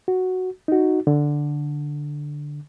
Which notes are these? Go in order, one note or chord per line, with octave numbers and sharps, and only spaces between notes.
F#4
D#4 F#4
D3